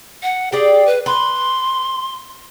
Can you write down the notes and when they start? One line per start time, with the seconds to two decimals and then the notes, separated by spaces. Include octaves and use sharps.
0.23 F#5
0.52 G4 G#4 D5
0.86 B4
1.06 B4 C6